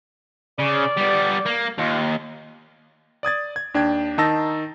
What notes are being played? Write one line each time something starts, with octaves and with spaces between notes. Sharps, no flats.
C#3 D5
G3 B3
A#3
D#2 F4
D5 D#6 G#6 A6
G#6
D#2 D4 G5 G#6
D#3 D#4 A5 E6 A6 A#6